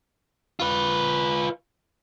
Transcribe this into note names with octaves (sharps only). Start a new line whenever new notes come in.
F4 B4